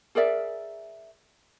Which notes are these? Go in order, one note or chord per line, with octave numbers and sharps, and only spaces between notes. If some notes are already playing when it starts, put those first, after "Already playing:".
G#4 A#4 D5 E5